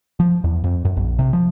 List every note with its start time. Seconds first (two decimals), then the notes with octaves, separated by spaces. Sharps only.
0.20 F3
0.44 E2
0.64 F2
0.85 F#2
0.97 A#1
1.19 C3
1.33 F3